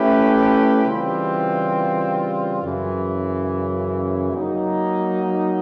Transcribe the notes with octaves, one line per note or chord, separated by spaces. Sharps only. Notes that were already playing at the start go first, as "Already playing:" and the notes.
Already playing: A3 C#4 E4 G4 B4
C#3 E3 G3 C4 F4
F#2 C#3 E3
F#3 A#3 D#4